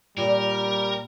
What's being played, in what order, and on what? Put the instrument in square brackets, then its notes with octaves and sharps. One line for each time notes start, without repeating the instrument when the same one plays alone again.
[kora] A#2 [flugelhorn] G3 [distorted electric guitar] A#4